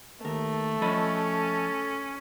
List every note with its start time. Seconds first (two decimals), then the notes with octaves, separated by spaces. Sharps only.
0.25 D#2 A3 A#4
0.82 F3 C#4 A4 D#5 B5